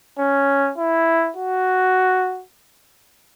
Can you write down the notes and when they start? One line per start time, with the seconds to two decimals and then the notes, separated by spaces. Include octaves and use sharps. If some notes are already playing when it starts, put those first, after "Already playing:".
0.18 C#4
0.78 E4
1.36 F#4